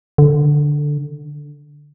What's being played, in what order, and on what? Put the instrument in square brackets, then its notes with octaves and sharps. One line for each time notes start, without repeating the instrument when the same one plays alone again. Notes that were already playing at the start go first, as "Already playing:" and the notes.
[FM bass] D3